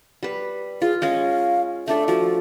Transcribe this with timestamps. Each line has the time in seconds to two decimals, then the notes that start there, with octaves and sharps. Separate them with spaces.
0.23 G3 B4
0.82 F4 G#4
1.02 G#3 C#4 C#5 F5
1.88 A3 D4 A4 E5
2.08 F3 F#4